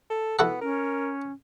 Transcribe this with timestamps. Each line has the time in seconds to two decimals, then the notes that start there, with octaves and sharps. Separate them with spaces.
0.10 A4
0.39 B3 E4 F#4 A4
0.61 C#4 A#4